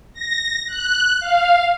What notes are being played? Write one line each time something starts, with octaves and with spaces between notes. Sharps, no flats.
A#6
F#6
F5